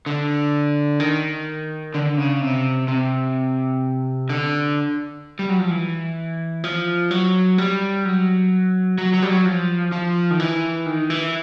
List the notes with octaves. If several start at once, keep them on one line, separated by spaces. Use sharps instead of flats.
D3
D#3
D3
C#3
C3
C3
D3
G3
F#3
F3
E3
F3
F#3
G3
F#3
F#3
F#3
G3
F#3
F3
F3
D#3
E3
D#3
E3